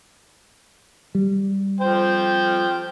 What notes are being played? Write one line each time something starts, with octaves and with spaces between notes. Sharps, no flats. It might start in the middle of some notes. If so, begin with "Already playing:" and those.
G3
F3 C5 G5